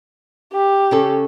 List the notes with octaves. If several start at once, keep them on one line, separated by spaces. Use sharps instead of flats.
G4
C#3 C#4 A4